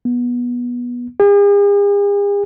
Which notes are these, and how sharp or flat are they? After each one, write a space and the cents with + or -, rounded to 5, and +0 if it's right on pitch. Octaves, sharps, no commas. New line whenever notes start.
B3 -20
G#4 -45